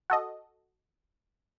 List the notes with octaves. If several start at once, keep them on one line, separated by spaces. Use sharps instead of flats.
F#4 A4 D#5